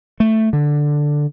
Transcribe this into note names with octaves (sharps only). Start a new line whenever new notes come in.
A3
D3